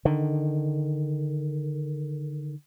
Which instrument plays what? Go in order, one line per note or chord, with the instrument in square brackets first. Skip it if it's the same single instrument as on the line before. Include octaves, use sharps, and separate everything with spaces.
[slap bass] D3 D#3